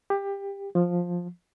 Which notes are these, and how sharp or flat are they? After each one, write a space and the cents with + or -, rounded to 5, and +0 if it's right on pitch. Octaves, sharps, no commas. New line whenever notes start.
G4 +20
F3 +10